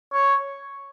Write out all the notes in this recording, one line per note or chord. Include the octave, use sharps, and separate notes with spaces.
C#5